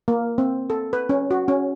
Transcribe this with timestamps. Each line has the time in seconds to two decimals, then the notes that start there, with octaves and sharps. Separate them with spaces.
0.08 A#3
0.38 C4
0.70 A4
0.93 B4
1.09 C#4
1.31 F#4
1.48 C#4